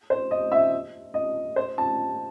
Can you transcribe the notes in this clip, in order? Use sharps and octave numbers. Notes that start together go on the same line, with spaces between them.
C5
D#5
E5
D#5
C5
A5